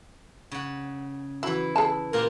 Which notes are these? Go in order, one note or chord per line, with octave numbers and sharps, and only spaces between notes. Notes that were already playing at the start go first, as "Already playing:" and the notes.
C#3 F#5
E3 F#3 E4
G#4 A5
A#2 A#3 G4 A#4